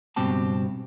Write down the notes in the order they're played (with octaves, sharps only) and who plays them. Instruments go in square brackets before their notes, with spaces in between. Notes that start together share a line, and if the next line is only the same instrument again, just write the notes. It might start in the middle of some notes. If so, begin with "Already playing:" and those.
[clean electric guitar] C#2 G2 B2 C4 G4 A5